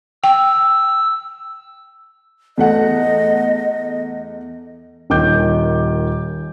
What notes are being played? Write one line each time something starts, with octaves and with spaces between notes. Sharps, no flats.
G5 E6
E2 A3 D#5 F#5
D#1 D#3 D6 G6